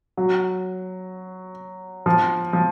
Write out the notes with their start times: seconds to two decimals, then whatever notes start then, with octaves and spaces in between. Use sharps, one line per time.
0.17 F#3
2.06 F3
2.53 F3